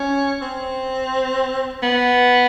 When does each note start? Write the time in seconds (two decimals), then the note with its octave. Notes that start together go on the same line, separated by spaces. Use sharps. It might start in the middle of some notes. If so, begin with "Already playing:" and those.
Already playing: C#4
0.42 C4
1.83 B3